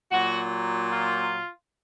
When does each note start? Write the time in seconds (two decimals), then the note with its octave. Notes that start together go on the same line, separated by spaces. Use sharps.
0.11 A#2 F#3 F#4
0.92 F4